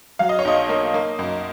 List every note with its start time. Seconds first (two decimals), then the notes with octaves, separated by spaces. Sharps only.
0.19 F#3 F5
0.29 D#5
0.39 C#5
0.45 B1 D#5
0.69 A#3
0.94 A#3
1.19 F#2